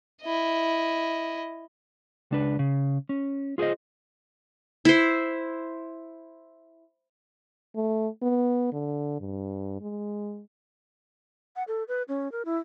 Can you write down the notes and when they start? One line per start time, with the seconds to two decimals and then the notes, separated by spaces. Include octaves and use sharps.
0.22 E4 D#5
2.31 C#2 D4 B4
2.59 C#3
3.09 C#4
3.58 F4 G#4 A#4 C5 D#5
4.85 E4 C5
7.76 A3
8.22 B3
8.72 D3
9.20 G2
9.81 G#3
11.56 F#5
11.68 A4
11.88 B4
12.08 C#4
12.32 A#4
12.45 E4